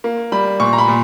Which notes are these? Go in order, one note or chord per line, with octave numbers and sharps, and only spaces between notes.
A#3
G3 B5
A#2 C#6
A#5
B5
A#2